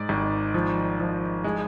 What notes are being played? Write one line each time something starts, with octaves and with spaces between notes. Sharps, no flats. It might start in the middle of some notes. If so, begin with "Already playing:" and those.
Already playing: G#2 D5
G#1
F3
F3
G#3